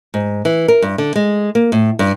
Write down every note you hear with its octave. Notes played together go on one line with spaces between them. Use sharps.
G#2
E3
A#4
G2
D3
G#3
A#3
A2
G2